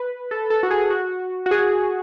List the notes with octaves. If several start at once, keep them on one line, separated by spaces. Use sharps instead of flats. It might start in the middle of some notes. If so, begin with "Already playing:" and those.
Already playing: B4
A4
A4
F#4
G#4
F#4
F#4
G#4